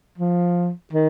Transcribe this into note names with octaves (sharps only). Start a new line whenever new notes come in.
F3
D#3